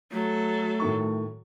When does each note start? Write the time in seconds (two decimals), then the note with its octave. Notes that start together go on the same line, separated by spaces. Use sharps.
0.12 F#3 A3 A4
0.80 A2 D#3 C#6